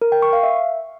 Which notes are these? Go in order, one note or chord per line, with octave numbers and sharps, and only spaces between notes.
A#4
G5
C#6
F5
E5